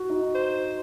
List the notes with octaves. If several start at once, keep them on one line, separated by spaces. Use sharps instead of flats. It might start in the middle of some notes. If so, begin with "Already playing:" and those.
Already playing: F#4
D#4
C5